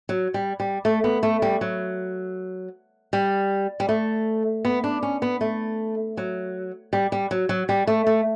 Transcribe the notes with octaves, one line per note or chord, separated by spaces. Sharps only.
F#3
G3
G3
A3
B3
A3
G3
F#3
G3
G3
A3
B3
D4
C#4
B3
A3
F#3
G3
G3
F#3
F#3
G3
A3
A3